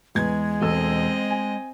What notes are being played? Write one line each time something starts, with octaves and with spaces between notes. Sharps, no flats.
E2 G#3 B4 G#6
E1 C4 A4 D#5 E6
G#5